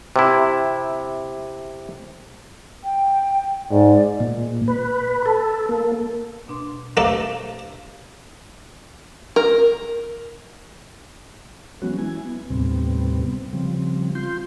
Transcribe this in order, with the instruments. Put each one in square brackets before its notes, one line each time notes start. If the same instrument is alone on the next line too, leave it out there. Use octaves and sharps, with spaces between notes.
[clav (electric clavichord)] C3 E4
[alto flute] G5
[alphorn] G#2 [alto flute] D5
[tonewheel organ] A#2
B4
A4
A#3
[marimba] B2 D4 C6
[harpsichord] A3 A#3 D5 [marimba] G4 C5 F5
[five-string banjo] A#4
[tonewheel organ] E3 F#3 G#3 B3 C#4 F#4
E4 G#5
B3
D#2 A2 C3 G3 B3 C4
C#3 F3 G3 C4
F4 C6 G6